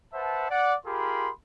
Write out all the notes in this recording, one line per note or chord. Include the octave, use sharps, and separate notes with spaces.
B4 C5 E5 F#5 A5
D5 F#5
F4 G4 G#4 A#4 B5 C6